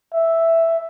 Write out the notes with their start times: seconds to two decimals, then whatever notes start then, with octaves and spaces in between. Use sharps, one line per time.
0.14 E5